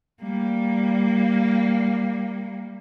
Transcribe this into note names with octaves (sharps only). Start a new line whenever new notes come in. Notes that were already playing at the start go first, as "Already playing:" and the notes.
G3 A#3